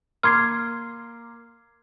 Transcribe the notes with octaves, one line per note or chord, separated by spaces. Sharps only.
A#3 C6 D6 F6 G#6 C7